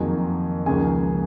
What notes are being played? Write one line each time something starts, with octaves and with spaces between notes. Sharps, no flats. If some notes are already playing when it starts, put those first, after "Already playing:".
Already playing: F2 D#3 F#3 A#3 G#4
C#2 C#3 F3 A#3 G#4 G#5